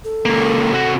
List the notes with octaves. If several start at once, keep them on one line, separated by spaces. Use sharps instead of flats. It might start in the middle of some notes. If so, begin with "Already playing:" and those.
A4
C#2 A#3
C3 F#4